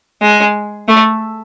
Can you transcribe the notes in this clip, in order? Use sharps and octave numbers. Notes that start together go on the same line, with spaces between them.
G#3
A3